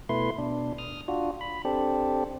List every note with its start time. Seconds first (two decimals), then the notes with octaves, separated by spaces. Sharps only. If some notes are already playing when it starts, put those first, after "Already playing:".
0.09 B2 A3 E4 B4 C6
0.38 B2 D4
0.78 D#6 F6
1.08 D4 F4 F#4
1.41 B5
1.65 C4 D4 G4 A4